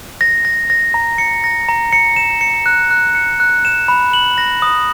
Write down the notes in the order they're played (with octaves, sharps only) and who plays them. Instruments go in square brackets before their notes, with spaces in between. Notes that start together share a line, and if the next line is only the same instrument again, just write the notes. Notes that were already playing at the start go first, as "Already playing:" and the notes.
[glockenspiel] A#6
A#6
A#6
A#5
C#7
A#6
A#5
C#7
E7
C#7
F#6
F#6
C#7
F#6
E7
B5
F#7
A#6
D#6